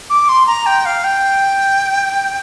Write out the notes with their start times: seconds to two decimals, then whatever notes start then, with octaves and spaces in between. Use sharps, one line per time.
0.10 D6
0.29 C6
0.47 A#5
0.66 G5
0.85 F5
1.04 G5